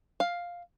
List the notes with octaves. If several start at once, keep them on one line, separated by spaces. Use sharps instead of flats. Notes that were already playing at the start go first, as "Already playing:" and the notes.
F5